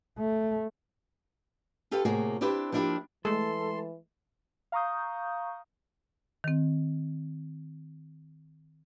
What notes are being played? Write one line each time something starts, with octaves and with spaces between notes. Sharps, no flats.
A3
F4 G4 A4 B4 F5
A2 C3 A#3 F#4 G#4
C4 D4 E4 G4 B4 C5
F3 A#3 D4 E4 F4 G4
E3 G#3 A3 A4 C6
F5 A#5 C#6 D#6 G6
D#3 C4